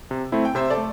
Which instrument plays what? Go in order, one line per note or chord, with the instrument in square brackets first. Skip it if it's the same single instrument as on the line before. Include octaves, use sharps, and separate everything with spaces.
[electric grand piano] C3
A3 C4 E4
[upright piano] G5
[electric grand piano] C3 [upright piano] C5 E5
[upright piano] A4 D5
[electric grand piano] A3